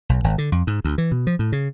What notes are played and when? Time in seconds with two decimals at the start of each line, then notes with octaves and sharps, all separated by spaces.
0.09 B1
0.24 G#1
0.38 D3
0.52 F2
0.67 G#2
0.85 D2
0.98 E3
1.12 B2
1.27 F3
1.39 A2
1.52 C#3